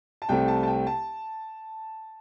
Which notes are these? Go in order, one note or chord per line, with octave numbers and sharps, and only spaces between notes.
A5
C2 C3 A3 C4 G5
A5
A5
G5
A5